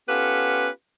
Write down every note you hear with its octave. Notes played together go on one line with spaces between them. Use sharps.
B3 C#4 F4 G4 A4 B4